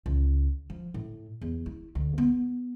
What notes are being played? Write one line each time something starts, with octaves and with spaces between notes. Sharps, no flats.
C#2
F3
A2
E2
E4
D2
B3